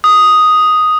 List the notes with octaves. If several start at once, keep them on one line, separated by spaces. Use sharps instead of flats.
D#6